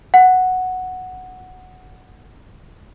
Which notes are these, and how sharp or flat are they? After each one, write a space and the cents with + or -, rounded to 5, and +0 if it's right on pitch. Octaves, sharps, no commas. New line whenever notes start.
F#5 +0